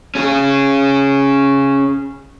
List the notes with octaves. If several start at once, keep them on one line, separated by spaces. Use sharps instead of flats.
C#4 G#4